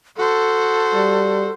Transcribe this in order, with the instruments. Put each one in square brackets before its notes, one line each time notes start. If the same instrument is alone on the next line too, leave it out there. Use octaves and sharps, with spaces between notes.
[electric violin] F#4 C5 [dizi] A4
[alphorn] G3